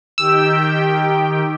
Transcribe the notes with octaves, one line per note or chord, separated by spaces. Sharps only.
D#3 G4 G5 E6